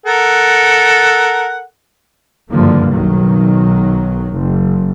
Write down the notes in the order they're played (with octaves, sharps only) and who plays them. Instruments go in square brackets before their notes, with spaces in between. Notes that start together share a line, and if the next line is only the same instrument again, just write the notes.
[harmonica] A4 A#4 F#5
[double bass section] F#1 G2 D3 F3 A#3
B1 D#3 F#3
F#1